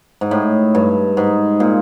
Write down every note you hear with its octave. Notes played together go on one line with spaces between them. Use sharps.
G#2
A2
G2
G#2
A#2